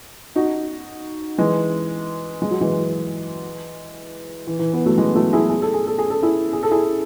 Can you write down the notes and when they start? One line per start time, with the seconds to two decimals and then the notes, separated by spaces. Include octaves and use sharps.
0.36 D#4 F#4
1.38 E3 G#3
2.42 G#3
2.51 F#3
2.61 E3 G#3
4.47 E3
4.59 E3
4.73 B3
4.85 F#3 A3
4.98 E3 G#3
5.15 F#3 A3
5.33 E4 G#4
5.49 G#4
5.62 A4
5.74 G#4
5.87 A4
5.99 G#4
6.10 A4
6.23 E4 G#4
6.53 G#4
6.63 A4
6.71 E4 G#4